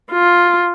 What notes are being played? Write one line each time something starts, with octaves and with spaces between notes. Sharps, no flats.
F4